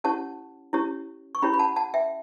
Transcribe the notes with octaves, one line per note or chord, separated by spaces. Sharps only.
C#4 E4 G4 C#5 F#5 A5
C#4 E4 G4 C#5
C#6
C#4 E4 G4 C#5 G5 B5
B5
F#5 A5
F#5 A5
E5 G5